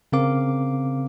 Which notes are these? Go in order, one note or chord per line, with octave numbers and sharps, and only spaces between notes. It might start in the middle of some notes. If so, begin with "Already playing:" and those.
C#3 C4 A#4 F5 D6